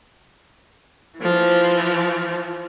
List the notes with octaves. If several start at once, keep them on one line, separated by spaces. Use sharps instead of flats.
E3 F3